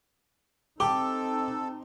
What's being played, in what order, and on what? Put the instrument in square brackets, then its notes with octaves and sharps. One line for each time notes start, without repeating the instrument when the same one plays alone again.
[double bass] C4 D#4 [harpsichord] G4 [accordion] A4 [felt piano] D6